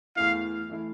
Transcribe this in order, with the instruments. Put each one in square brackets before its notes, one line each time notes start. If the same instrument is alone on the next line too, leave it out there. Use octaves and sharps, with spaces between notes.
[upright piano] E2 E3 A3 E4 [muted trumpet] F5
[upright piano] E3 A3 E4